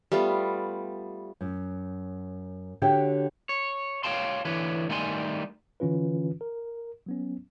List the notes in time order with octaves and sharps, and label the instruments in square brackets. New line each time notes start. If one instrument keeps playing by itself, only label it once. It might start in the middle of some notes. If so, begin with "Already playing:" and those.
[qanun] G3 A3 B3 F4
[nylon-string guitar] F#2
D3 F#4 G4 C#5 E5 G5
[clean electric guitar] C#5
C#5 D5 F5 G5 A5 C6
D3 E3 B4 C#5
D#3 G3 A3 D#4 G#5 C6
[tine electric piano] D3 E3 C#4 F4 B4
A#4
F#3 B3 C#4